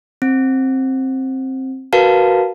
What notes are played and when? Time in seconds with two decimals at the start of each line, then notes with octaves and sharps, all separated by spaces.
0.22 C4
1.93 F#4 A#4 B4 F5 A5